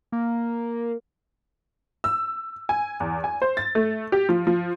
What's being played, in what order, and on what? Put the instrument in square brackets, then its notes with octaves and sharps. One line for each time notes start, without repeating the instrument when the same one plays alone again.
[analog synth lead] A#3
[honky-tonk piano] E6
G#5
E2
G#5
C5
A6
A3
G4
F3
F3